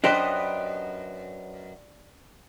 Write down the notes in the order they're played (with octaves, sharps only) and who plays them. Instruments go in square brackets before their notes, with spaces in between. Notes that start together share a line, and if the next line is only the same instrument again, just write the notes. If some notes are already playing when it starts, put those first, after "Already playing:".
[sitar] F#2 B4 D#5 [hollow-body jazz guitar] D4 G4 C5